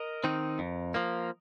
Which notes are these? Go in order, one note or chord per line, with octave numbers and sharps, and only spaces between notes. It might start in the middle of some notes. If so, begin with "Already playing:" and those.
Already playing: A#4 D#5
D#3 C4 D#4
F2
F3 A#3